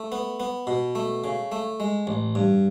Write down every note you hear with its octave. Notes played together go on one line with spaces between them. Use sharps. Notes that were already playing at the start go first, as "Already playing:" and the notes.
Already playing: A3
B3
B3
B2
A3
C#3
A3
G#3
A1
G2